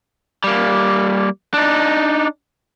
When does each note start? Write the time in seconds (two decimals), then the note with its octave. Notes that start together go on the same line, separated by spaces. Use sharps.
0.44 G3 A#3
1.54 D4 D#4